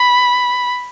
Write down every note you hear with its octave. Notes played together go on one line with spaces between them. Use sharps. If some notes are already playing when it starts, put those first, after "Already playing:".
Already playing: B5